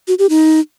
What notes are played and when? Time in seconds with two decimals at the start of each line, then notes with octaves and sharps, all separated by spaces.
0.08 F#4
0.19 G4
0.30 D#4